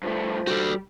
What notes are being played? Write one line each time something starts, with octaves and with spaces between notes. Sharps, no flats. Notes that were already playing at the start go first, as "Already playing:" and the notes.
G2 F3 A3
G3 F#4 A4